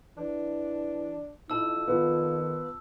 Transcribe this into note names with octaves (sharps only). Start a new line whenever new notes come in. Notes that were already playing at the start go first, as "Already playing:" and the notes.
E3 D4
F2 D#4 E4 A5 E6
D#3 B3 F4